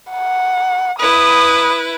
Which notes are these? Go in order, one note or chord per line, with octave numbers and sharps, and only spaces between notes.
F#5
E4 B4 D#6